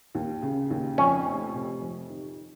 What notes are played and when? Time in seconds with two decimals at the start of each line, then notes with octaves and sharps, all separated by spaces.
0.15 D#2
0.42 C#3
0.70 D#2
0.98 F2 C#4
1.26 F1
1.54 C3
1.82 F2
2.10 D#3